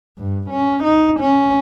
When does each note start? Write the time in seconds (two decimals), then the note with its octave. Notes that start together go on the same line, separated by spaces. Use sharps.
0.19 G2
0.50 C#4
0.84 D#4
1.20 C#4